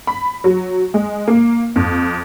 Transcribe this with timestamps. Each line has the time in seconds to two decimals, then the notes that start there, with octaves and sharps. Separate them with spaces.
0.07 B5
0.44 F#3
0.94 G#3
1.28 A#3
1.76 F2